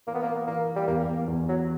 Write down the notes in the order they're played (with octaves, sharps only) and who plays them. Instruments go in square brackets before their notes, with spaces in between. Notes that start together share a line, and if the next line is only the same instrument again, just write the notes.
[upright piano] E3 [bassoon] A#3
[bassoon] B3
A#3
[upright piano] E3 [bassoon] A#3
[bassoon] G3
[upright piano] E2 [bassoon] A#3
[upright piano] E2
[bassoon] F#3